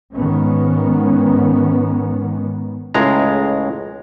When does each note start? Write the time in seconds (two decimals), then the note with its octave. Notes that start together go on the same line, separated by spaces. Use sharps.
0.13 G#2 D#3 B3 C#4
2.94 C#2 A2 G#3 A#5